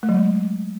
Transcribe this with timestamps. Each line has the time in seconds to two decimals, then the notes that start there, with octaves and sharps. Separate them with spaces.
0.03 A3
0.09 F#3
0.14 G#3